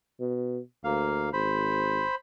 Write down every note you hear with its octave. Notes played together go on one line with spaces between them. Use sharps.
B2
D2 A#3 F5
G#1 C5 B5